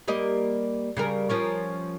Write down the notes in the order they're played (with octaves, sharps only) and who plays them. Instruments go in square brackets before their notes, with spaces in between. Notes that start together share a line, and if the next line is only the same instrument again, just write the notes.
[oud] G3 A#3 D#5
C#3 G3 A#4
F3 C#4 A#4